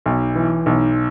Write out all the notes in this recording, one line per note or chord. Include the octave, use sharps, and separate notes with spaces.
B1
E3
B1